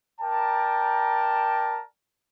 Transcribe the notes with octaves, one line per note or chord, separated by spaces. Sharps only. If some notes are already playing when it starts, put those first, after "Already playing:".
A#4 D5 G5 A5 A#5